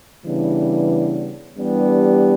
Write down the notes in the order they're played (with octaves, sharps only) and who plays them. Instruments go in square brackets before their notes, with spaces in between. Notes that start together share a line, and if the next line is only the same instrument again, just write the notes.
[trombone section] C#3 E3 G3 B3 D4
E3 G3 B3 D4 G4